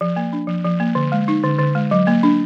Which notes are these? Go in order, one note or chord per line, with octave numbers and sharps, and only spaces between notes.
F3
A#3
D4
F3
F3
A#3
D3
G#3
D#4
D3
D3
G#3
F#3
A#3
D4